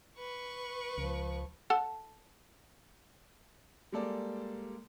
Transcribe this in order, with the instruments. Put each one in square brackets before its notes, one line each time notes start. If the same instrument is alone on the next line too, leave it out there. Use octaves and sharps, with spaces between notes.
[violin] B4 C#6
[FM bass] C#2 [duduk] F3
[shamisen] A4 F#5 A5
[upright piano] G3 G#3 A#3 A4 D5